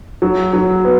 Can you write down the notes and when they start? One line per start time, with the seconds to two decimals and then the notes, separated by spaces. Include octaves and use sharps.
0.22 F#3
0.53 F#3
0.85 B3